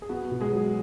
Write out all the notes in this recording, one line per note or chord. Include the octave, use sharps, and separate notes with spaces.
G#4
B3 F#4
B2
G#3 G#4
F#3